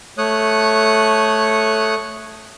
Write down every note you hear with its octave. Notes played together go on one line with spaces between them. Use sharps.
A3 C#5 D#6 F#6